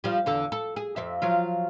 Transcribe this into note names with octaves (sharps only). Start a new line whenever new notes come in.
F3 G3
E2 D3 A4
A4
G#4
F2 F3 E5
F3 F#3 F4